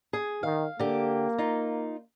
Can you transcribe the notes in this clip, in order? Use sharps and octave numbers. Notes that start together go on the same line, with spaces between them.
G#4
D#3 F5
D3 A#3 G4
D#4 F4